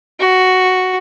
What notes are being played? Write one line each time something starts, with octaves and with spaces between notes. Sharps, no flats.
F#4